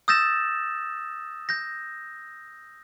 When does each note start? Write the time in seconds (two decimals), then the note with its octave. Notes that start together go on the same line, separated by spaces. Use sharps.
0.08 D#6 E6 G6 A6 A#6 E7
1.49 G6 A#6